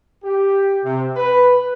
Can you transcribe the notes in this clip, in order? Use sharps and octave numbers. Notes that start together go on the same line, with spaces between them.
G4
C3
B4